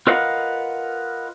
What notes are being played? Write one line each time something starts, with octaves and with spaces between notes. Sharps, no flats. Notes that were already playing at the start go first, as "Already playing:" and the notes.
F4 A#4 B4 D#5 F5 F#5